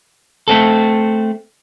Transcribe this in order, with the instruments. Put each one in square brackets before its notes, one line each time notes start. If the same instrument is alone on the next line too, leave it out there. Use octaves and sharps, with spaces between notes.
[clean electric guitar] A3 C4 A4